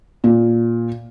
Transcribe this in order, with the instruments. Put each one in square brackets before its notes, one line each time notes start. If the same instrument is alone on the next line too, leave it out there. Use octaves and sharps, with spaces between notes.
[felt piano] A#2